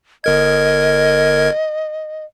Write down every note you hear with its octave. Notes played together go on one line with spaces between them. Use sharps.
G1 A#4 D#5 G#6